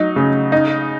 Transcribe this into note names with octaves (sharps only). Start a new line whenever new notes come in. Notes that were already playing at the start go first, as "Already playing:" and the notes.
Already playing: F#3 D#4
C#3
D#4